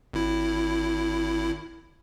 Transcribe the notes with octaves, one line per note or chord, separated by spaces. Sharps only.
G#1 E4